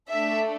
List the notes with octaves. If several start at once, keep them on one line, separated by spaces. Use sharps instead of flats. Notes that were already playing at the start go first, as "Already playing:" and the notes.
A3 D4 A4 E5